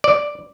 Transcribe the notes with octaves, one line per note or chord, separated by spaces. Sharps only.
D5